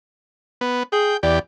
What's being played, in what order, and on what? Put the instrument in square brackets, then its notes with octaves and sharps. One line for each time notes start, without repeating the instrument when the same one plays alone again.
[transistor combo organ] B3
[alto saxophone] G#4 [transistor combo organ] G5
[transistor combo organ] E2 G4 [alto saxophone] D5